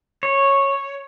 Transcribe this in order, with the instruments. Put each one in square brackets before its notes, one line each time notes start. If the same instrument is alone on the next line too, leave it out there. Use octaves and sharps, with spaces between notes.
[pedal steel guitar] C#5